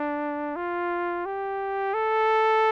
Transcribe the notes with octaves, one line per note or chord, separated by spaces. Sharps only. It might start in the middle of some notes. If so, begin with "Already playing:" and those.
Already playing: D4
F4
G4
A4